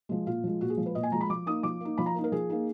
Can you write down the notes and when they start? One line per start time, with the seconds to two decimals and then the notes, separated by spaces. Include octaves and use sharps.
0.09 F3 G#3
0.26 A#2 F4
0.44 F3 G#3
0.61 A#2 F#4
0.70 G#4
0.77 F3 G#3
0.86 B4
0.95 A#2 D#5
1.03 G#5
1.12 F3 G#3 A#5
1.21 B5
1.29 F3 D6
1.46 A#3 D#4 D#6
1.63 F3 D6
1.80 A#3 D#4
1.98 F3 B5
2.06 A#5
2.15 A#3 D#4
2.24 A#4
2.32 F3 G#4
2.50 A#3 D#4